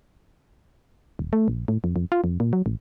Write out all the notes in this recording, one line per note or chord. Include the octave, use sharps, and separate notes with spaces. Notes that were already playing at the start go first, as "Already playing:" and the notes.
D#1
A3
A#1
A2
F2
F2
F4
F2
A#2
F#3
A1